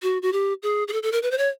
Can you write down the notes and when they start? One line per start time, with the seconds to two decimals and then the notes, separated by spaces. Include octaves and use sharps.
0.03 F#4
0.22 F#4
0.33 G4
0.63 G#4
0.88 G#4
0.93 A4
1.03 A4
1.12 A#4
1.23 B4
1.31 C5
1.38 C#5